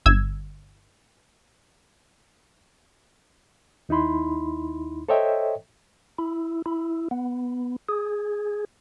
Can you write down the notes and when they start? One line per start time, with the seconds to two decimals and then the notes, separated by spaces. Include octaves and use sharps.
0.06 G1 E6 G#6
3.89 D#2 D#4 E4 B5 C6
5.09 A4 C5 C#5 D#5 E5 G5
6.18 E4
6.66 E4
7.11 B3
7.89 G#4